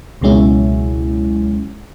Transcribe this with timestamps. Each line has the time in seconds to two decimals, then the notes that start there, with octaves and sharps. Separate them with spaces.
0.21 C#2 B2 F#3 G#3 C#4 E4